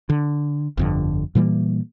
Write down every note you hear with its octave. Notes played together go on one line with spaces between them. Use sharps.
D3
G1 F2 D3
A#2 E3 G3 A#3